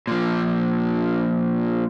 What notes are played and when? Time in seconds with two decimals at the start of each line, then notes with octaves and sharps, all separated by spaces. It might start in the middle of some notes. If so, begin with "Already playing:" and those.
0.07 A#2 F3